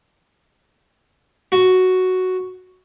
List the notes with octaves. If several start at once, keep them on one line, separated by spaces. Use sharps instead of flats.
F#4